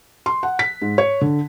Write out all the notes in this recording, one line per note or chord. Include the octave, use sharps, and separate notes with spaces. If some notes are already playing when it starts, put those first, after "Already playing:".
C6
F#5
B6
G#2
C#5
D3